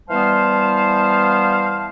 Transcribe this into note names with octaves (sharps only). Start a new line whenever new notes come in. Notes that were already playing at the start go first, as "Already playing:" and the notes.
E3 G3 B3 C5 F5 A5